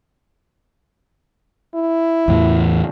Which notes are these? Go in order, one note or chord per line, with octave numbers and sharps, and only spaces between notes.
E4
E2 A2 E3